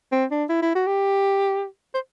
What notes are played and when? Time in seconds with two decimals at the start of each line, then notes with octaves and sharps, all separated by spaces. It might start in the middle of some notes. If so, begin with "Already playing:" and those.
0.12 C4
0.31 D4
0.49 E4
0.62 E4
0.75 F#4
0.87 G4
1.94 C5